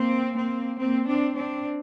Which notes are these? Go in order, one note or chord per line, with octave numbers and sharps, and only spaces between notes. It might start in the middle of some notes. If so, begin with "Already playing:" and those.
Already playing: A#3 C4
A#3 C4
A#3 C4
C4 D4
C4 D4